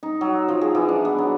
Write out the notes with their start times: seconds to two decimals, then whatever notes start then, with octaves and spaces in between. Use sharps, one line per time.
0.03 D#4
0.21 F#3
0.48 F3
0.61 G#4
0.75 E3
0.89 D4
1.05 B3
1.18 F#3